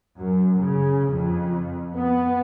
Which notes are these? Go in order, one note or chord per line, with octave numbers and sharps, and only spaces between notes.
F#2
C#3
F2
B3